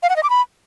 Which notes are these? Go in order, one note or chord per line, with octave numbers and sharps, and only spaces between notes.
F5
F#5
D#5
D6
B5